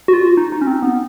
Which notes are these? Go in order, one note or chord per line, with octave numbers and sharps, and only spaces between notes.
F#4
F4
D#4
D#4
C#4
C4
B3